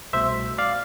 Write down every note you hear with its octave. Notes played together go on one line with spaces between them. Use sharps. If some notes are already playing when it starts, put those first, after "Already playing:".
C2 B2 A3 C5 E5
D5 F5